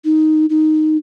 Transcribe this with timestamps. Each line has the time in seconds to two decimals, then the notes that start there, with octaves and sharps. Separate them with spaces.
0.05 D#4
0.50 D#4